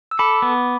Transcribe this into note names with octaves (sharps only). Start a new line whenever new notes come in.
E6
A4 B5 D6
B3